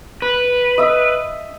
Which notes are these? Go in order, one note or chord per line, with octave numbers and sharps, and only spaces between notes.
B4
D#5 E5